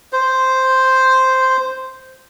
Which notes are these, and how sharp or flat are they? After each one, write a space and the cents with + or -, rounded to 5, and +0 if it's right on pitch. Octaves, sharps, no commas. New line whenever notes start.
C5 -5